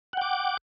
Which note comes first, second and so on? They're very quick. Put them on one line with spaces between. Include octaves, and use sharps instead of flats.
F#5 G5 D6